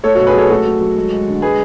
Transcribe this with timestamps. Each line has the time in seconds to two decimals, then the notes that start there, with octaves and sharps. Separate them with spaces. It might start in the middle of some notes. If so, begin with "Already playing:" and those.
0.03 A3 A4 C#5
0.15 B2 F#4 A4
0.27 G#4 B4
0.34 F#3 A4 C#5
0.49 A3 F#4 A4
0.65 F#3
0.81 F#3
0.96 G#3
1.12 G#3
1.27 D3
1.42 G#3 G#4 B4